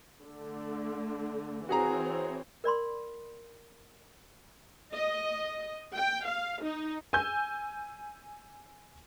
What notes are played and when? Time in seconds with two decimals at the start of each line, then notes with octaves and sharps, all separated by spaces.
0.25 D3 A3
1.69 E3 C4 F#4 G#4 C#5 A#5
2.64 A#4 D5 B5 C6
4.93 D#5
5.95 G5
6.27 F5
6.63 D#4
7.13 G#5 E6 G6